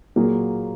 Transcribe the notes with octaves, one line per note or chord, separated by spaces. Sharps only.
A#2 F#3 A#3 F4 G#4